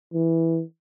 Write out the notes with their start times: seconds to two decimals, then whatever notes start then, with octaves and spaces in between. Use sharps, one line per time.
0.14 E3